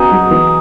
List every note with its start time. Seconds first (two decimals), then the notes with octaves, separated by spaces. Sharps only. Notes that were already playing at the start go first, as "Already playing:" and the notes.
Already playing: C#3 B3 D#4 F#4 G#4
0.12 F#3
0.31 E3